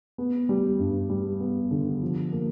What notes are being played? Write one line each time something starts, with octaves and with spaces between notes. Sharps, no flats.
B3
G3
G2
G3
B3
D3
F3
A#3